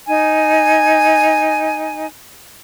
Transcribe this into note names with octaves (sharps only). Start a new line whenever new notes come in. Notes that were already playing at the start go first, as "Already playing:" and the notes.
D#4 G#5